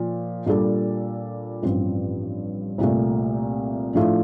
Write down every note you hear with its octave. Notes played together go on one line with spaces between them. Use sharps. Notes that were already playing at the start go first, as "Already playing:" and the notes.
Already playing: A#2 F3
A#2 G3 D4 A4
A1 G2 F3 C4
C2 A#2 A3
A2 F3 A3 D4